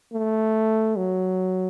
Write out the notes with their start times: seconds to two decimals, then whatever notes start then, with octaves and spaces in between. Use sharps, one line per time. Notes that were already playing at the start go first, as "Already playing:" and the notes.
0.14 A3
0.96 F#3